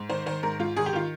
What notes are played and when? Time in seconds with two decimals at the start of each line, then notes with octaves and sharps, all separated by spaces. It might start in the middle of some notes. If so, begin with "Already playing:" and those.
Already playing: G#2
0.10 D#3 C5
0.26 D#3 C5
0.43 G#2 A#4
0.59 G#2 F4
0.76 D#3 G#4
0.86 G4
0.93 D#3 F4